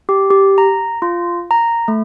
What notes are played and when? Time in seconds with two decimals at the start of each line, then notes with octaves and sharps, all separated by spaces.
0.09 G4
0.30 G4
0.58 A#5
1.02 F4
1.51 A#5
1.88 A3